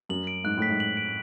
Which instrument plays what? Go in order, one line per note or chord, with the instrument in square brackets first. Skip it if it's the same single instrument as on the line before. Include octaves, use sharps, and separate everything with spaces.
[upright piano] F#2 [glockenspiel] F#7
[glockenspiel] D7
[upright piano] G#2 [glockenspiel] F#6
[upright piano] A2 [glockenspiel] B6
[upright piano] G#2
[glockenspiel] F#7
D7